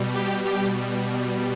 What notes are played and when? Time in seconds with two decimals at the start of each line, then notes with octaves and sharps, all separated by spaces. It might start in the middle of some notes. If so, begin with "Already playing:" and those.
Already playing: B2 G3
0.15 G4
0.45 G4